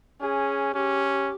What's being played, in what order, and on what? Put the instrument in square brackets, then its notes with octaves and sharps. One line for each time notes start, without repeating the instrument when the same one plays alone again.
[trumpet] C#4 [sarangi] G#4
[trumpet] C#4 [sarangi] G4